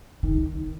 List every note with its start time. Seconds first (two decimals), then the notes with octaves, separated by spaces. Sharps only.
0.23 D#3